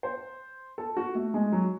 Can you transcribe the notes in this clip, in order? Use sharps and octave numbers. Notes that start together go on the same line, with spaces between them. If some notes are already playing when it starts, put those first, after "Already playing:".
C5
A4
F#4
A3
G#3
F#3